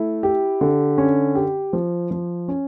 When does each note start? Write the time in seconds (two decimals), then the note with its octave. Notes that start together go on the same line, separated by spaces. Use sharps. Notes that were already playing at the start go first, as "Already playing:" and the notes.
Already playing: A3 E4
0.23 G4
0.61 D3
0.98 C#4
1.35 G4
1.73 F3
2.11 F3
2.48 C#4